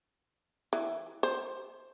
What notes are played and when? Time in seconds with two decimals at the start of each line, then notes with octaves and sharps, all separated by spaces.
0.73 E3
1.23 C5